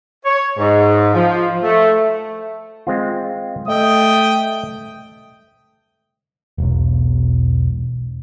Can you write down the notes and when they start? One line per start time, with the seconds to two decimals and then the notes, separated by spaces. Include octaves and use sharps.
0.25 C#5
0.58 G#2
1.14 F3
1.63 A3
2.87 G#3 C4 F4
3.68 A3 D#5 E5 G5 D#6
6.58 E1 B1